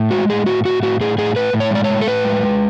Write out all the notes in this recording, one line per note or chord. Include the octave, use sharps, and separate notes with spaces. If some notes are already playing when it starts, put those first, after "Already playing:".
Already playing: A2
G#3 F#4
A2 G#4
A2 F#4
A2 F#4
A2 F#4
A2 G#4
A2 G#4
A2 B4
A2
C#5
G#3 D5
C#5
A2
A4
A2 B4
G#3
G#3